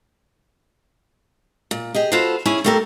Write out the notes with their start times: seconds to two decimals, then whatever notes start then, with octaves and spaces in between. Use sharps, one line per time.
1.71 A#2
1.95 G4 G#4 D#5
2.12 F4 F#4 A4 B4 C5
2.46 C#4 E4 G#4 G#5
2.64 A3 A#3 G4 A4 A#4